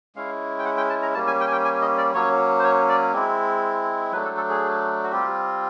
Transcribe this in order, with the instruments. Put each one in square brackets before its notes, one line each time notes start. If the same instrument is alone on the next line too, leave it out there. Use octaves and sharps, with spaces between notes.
[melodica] G#3 C#4 E4 F5
G5
F#5
G5
A5
A#5
G3 A#3 C#4 A5
G#5
G5
G#5
G5
G#5
D#5
D5
F#3 A#3 C#4 C#5
C5
C#5
D5
G#3 C4 E4
F#3 A3 D4 B4
A4
A4
G#4
F#4
G3 C4 F4 G4